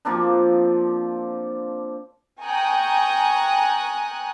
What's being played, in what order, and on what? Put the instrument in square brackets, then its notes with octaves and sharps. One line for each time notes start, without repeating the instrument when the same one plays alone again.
[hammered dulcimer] F3 A#3 C4 D4
[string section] G5 G#5 A#5 C#6 D#6 F#6